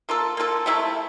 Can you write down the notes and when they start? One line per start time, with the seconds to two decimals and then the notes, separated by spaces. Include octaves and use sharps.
0.09 A#3 F4 A4
0.37 A#3 F4 A4
0.66 C3 F3 A3 E4